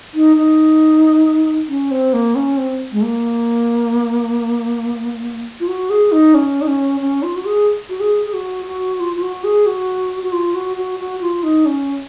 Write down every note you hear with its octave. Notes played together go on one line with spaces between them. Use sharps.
D#4
D#4
C#4
C4
A#3
C#4
C4
G#3
A#3
F4
F#4
G#4
D#4
C#4
D#4
C#4
C#4
F4
F#4
G#4
F#4
G#4
G#4
F#4
F#4
F4
F4
F#4
G#4
F#4
F#4
F4
F#4
F#4
F#4
F4
D#4
C#4